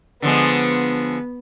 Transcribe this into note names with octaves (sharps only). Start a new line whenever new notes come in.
D3 F3 G#3 B3